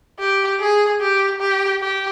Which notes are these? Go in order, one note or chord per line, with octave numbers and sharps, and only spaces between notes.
G4
G#4
G4
G4
G4